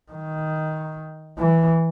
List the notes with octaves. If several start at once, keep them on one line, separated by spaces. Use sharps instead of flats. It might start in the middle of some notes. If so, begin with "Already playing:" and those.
D#3
E3